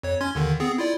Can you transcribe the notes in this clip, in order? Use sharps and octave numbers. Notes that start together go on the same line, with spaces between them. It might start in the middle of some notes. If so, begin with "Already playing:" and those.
F2 C#5
C#4 C6 G#6
D#2 D3 D#3
B3 C4 G#4
E4 F4 D5